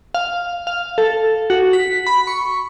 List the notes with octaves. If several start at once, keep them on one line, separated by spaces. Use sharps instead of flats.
F5
F5
A4
F#4
B6
B5
C#6